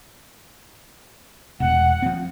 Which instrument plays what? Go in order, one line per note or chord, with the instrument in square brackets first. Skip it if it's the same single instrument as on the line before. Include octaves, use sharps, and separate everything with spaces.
[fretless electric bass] E1 [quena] F#5
[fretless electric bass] F3 C4